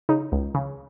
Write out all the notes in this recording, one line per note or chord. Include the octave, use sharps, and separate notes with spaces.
C#3 D#4
C#2
C#3